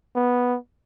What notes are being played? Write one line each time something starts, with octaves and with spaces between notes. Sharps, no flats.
B3